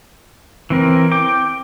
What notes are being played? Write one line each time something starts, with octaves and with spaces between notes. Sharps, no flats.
E3 C4 A#4
G5 D6